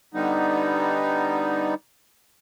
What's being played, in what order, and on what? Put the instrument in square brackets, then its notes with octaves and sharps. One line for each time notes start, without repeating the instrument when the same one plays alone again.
[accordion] D3 G3 B3 D#4